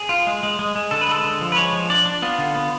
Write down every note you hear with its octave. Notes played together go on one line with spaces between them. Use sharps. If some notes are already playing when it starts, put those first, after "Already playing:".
Already playing: G#4
F4
G#3
G#3
G#3
G#3
D3 A4
B4
G#3 A4
D3
F3
B4
G#3 C#5
F3
D4 D5
D4
B3 F4
D3
B3